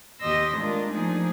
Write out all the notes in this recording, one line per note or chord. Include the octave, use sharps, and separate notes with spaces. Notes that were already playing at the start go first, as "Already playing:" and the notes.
D#2 G4 D#5 C6 E6 A#6
G#3 A3 D4 F4 A#4
F3 A3 A#3 D4 D#4 G#4